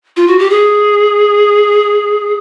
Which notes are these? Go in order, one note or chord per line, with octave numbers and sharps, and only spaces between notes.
F4
F#4
G4
G#4